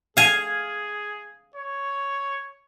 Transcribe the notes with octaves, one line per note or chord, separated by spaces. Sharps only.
G#4 F5 G#5
C#5